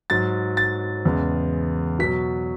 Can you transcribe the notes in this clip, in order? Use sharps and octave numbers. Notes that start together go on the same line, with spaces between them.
G#2 F#3 A6
A6
E2 C#3 G#3
B2 F#3 B6